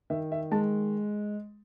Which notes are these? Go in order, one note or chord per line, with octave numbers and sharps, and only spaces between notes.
D#3 E5
E5
G#3 A5